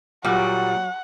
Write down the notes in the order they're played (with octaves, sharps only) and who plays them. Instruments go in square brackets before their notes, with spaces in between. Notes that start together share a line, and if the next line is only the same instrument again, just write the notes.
[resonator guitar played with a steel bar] A#2 G3 [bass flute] F#3 [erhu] F#5